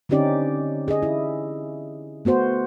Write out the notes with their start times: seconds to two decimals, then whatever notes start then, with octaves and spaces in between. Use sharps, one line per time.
0.09 D3 C4 C#4 D#4 G4 D5
0.88 G#4 D#5
1.02 E4
2.25 A3 B3 F#4 C5